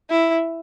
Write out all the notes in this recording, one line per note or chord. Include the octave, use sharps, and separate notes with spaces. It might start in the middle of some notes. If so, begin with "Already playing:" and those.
E4